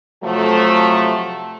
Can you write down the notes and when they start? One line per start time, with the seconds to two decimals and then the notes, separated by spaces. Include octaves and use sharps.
0.24 C3 F3 F#3 A3